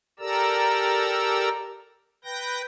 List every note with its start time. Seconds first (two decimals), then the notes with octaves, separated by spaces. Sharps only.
0.19 G4 A4 A#4 D5 A#5 E6
2.24 B4 G5 G6 A#6